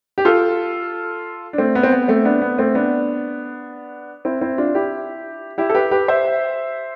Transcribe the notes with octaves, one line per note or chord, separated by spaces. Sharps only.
G4
F4 A4
D4
A3 C4
B3
C4
B3
A3 C4
B3 D4
B3
A3 C4
B3 D4
C4 E4
C4 E4
D4 F4
E4 G4
E4 G4
A4
G4 B4
G4 B4
C5 E5